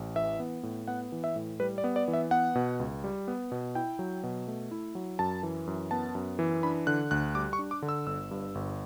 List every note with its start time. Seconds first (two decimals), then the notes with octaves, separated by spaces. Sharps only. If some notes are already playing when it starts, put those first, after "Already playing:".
Already playing: A1
0.16 E3 E5
0.40 B3
0.63 A2
0.88 B3 F#5
1.12 E3
1.24 E5
1.36 A2
1.60 G3 B4
1.78 D5
1.84 B3
1.96 D5
2.08 E3
2.14 E5
2.31 B3 F#5
2.55 B2
2.80 C#2
3.04 G3
3.28 B3
3.52 B2
3.75 E4 G5
3.99 F#3
4.23 B2
4.47 A3
4.71 E4
4.95 F#3
5.19 F#2 A5
5.43 E3
5.67 F#2
5.91 B3 A5
6.15 F#2
6.39 E3
6.63 D4 B5
6.87 D3 F#6
7.11 D2 F#6
7.35 G3 D6
7.53 C#6
7.59 D4
7.71 D6
7.82 D3
7.89 E6
8.06 G1 E6
8.31 G2
8.55 G1